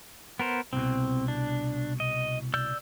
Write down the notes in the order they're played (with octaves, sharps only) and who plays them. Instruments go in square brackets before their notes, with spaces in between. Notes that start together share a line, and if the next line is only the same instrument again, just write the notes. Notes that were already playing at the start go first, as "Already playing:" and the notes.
[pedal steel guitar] B3 A#4 C5
[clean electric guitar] C2 B2 [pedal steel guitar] C4
[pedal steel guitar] D4
D#5
D5 E6 G6